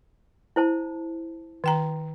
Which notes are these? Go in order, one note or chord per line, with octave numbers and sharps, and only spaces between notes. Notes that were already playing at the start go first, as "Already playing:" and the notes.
E4 C5 A5
D#3 G5 A#5